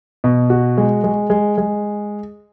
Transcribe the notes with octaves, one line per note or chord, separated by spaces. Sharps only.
B2
F#4
G#3
G#3
G#3
G#3